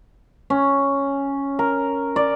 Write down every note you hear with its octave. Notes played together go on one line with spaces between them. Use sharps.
C#4
A#4
D5